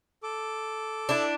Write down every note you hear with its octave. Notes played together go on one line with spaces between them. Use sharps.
A4 D6
D4 E4